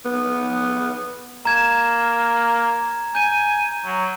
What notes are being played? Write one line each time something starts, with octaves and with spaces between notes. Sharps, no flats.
B3
A#3 A#5 G#6 E7
G#5 G6 D#7
F#3